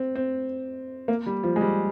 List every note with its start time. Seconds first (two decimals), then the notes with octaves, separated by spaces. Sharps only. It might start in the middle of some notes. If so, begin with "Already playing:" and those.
Already playing: C4
0.16 C4
1.08 A#3
1.26 G3
1.43 F3
1.56 G#3
1.61 G3